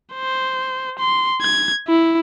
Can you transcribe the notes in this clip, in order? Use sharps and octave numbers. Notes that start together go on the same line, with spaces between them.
C5
C6
G#6
E4